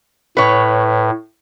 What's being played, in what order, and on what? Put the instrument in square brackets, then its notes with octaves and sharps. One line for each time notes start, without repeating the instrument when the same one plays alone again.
[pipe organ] A2 [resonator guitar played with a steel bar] B4 C#5